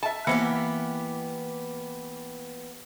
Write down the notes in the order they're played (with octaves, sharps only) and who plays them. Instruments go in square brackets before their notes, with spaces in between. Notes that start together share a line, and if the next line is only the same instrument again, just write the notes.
[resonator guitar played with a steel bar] E5 A5
[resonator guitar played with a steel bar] E3 [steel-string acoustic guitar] A#3 B3 G4